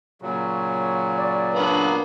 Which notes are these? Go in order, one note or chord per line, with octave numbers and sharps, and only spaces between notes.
A#2 C#3 F#3
D5
A#3 B3 D4